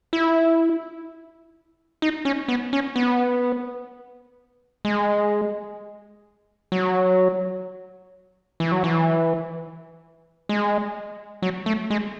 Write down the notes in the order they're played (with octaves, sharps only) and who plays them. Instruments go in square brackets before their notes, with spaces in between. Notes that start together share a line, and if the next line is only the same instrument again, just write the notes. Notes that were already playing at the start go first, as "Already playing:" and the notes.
[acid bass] E4
D#4
C#4
B3
C#4
B3
G#3
F#3
E3
F#3
E3
G#3
F#3
A3
G#3